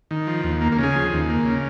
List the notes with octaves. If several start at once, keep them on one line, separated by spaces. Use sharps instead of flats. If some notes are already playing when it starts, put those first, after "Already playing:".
D#3
F3
D#2
A#3
A#3
C#3 G#4
F3
D#2
A#3
C#3